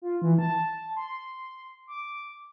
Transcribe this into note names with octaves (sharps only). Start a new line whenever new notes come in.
F4
E3
A5
C6
D6